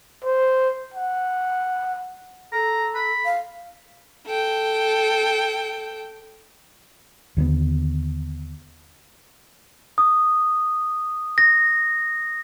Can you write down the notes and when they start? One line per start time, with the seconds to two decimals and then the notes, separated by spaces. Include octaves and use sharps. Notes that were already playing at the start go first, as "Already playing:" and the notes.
0.24 C5
0.94 F#5
2.52 A4 A#5
2.95 B5
3.25 F5
4.26 A4 G5
7.37 D#2 D3 D#3 B3
9.98 D#6
11.38 A#6